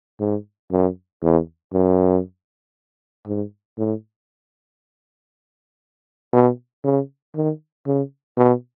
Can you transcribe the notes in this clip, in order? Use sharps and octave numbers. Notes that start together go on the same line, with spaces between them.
G#2
F#2
E2
F#2
G#2
A2
B2
C#3
D#3
C#3
B2